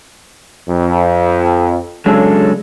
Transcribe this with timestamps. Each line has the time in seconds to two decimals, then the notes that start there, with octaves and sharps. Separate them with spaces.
0.69 F2
2.06 C#3 F#3 G#3 D4 A4